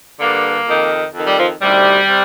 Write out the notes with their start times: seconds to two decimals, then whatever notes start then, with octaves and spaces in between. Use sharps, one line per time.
0.19 G2 D3 A#3
0.66 F2 D#3
1.13 F2
1.18 D#3
1.26 G3
1.38 F3
1.61 D2 C3 D#3 G3
2.09 C3